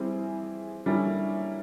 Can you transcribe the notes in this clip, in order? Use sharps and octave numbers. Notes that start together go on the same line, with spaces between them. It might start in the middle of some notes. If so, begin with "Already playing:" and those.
Already playing: E3 G3 C4 E4 G#4
D3 G3 A#3 C#4 E4